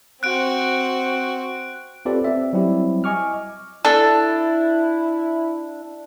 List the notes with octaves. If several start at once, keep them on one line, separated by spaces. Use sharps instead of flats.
C4 F#4 F#6 D7
C4 F4 G4 A4 B4 D5
C4 G4 D5 E5
F#3 G3 C4 E4 F#4
D#5 G#5 C#6 D6 F6
D4 E4 A4